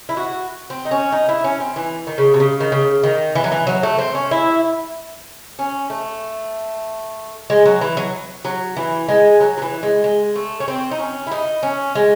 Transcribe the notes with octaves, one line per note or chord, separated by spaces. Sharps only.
E4
F#4
C4
D#4
C#4
D#4
E4
C#4
C4
E3
D#3
C#3
C3
C#3
D#3
C#3
D#3
E3
F#3
E3
F#3
A3
C4
C#4
E4
C#4
A3
G#3
F#3
E3
F#3
F#3
E3
G#3
F#3
F#3
E3
G#3
G#3
A3
C#4
C4
D#4
C#4
E4
D#4
C#4
G#3